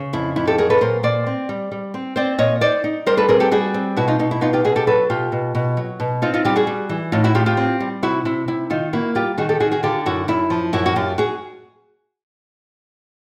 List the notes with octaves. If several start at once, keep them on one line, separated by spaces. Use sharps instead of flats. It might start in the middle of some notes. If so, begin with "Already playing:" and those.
Already playing: C#3
F2 E4
F2 E4
G4 A4
F#3 G#4 A#4
A4 B4
A#2 A#4 C5
A#2 C5 D5
C4
G3
G3
C4
C4 C5 D5
A#2 C#5 D#5
D#4 C5 D5
D#4
G3 A#4 C5
A4 B4
C4 G#4 A#4
G4 A4
G3 F#4 G#4
C4
B2 E4 F#4
D#4 F4
B2 D#4
E4
B3 D#4 F4
F4 G4
B2 F#4 G#4
G4 A4
F#3 A4 B4
B2 F4 G4
B2
B2
F#3
B2
C4 D#4 F4
D#4 F4
G3 F4 G4
F#4 G#4
G3
E3
A2 D#4 F4
E4 F#4
A2 F4 G4
F4 G4
C4
G3
C3 E4 F#4
C3 E4
C3 E4
D#3 D#4 F4
A#3 E4 F#4
G3 F4 G4
D#3 F#4 G#4
G4 A4
D#3 F#4 G#4
F#4 G#4
D3 F4 G4
F#2 E4 F#4
F#2 E4
F3
F#2 E4 F#4
F#4
F#2 F4 G4
F#4 G#4